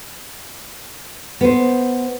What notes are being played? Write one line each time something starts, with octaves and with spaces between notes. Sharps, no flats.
B3 C5